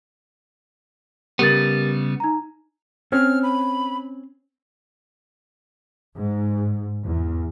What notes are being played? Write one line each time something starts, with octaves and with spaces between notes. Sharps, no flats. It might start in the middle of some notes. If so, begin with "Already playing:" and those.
C#3 G3 B3 G4 A#4 A6
D#4 A#5
C4 C#4 F6
B5
G#2
E2